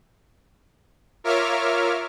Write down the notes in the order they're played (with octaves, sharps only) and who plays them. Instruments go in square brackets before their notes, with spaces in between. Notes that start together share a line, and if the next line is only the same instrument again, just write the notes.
[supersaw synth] F4 A#4 C#5 E5 D6 F6